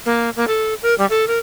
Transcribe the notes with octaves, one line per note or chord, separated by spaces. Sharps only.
A#3
A#3
A4
A#4
G3
A4
A#4